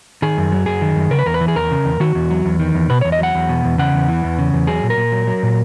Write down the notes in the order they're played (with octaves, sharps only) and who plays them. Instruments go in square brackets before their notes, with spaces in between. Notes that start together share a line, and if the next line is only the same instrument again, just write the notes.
[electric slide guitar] D#3 G#4
F#2
F#3
F#2 G#4
D#3
F#2
C#3 A#4
B4
E2 A#4
B4
E3
G#4
E2 A#4
C#3
E2
D#3 F#4
E2
F#3
E2
D#3
E2
B2 B4
E2 C#5
D#5
F#3 F#5
E2
B2
E2
C#3 F#5
E2
E3
E2
C#3
E2
F#3 G#4
A#2
A#4
A#2
F#3
F#3
A#2